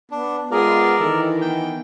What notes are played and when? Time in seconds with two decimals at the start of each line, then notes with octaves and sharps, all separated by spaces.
0.11 B3 D4
0.51 G#3 B3 F4 G#4 A#4 D5
0.99 D#3 E3 A4
1.41 B3 G5